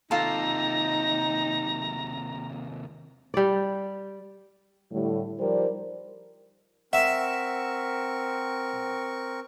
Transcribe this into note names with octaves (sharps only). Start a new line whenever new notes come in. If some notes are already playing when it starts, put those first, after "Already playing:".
D#2 C3 D#4 F4 A4 A#5
G3 D5
A2 D3 G3
F3 G3 D#4 A#4 C5 D5
C4 A#4 E5 F#5 C#6